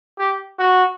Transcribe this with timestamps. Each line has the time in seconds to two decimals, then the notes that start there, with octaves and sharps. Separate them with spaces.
0.19 G4
0.59 F#4